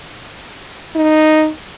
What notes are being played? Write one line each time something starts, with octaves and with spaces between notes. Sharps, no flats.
D#4